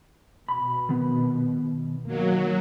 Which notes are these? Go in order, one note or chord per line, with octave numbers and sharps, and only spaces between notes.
B2 B5
D#3 B3
D#3 F#3 A#3